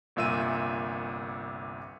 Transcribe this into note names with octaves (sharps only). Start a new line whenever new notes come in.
G1 C2 A#2 E5 E6 D#7